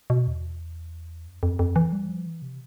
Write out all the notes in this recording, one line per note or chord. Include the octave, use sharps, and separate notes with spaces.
B2
E2
F2
F2
F2
E3
G3
F3
E3
C3